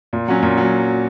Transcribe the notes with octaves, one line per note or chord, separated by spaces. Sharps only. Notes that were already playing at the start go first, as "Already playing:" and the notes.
A#2
F#3 C#4
A#2
F#3